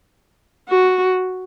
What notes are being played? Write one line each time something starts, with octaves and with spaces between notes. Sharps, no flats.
F#4